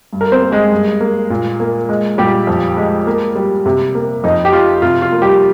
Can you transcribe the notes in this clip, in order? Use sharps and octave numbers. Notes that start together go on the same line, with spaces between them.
G2
A#4
C4 C5
A#3
G#3 G#4
G2
A#3
A#2
A#3
G#3
A#2 G3 G4
F2
G#3
A#3
G3
C3
A#3
F2 D#4
G4
F3 F4
C3 F4
F4
A#3
G3 G4